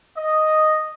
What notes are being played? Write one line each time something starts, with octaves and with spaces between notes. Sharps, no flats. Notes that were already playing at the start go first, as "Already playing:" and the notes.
D#5